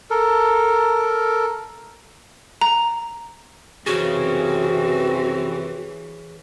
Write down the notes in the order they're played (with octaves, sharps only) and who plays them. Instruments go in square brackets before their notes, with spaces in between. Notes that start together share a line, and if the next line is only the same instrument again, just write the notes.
[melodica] A4 A#4
[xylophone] A#5
[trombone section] F#2 C3 C4 [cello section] E3 [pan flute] F#4 [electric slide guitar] G#4 C#5